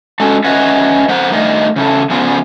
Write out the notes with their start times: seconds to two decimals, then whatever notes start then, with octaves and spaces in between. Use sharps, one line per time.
0.20 G#3 C#4 F#4 A4
0.44 C#4 B4 C#5 D#5 E5 F#5
1.09 A#3 C5 F#5
1.31 G2 A3 D#4 A#4 D#5
1.76 C#3 E4 A4
2.10 C#3 F3 B3 F4